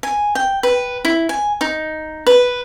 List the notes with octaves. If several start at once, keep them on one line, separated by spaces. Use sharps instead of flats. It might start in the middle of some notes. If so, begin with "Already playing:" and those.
G#5
G5
B4
E4
G#5
D#4
B4